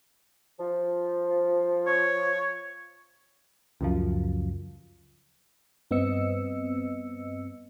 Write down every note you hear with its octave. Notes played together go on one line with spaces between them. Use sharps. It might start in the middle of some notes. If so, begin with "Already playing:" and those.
F3
C#5
C#2 F#2 F3
G2 B3 C4 D#5 E6 C#7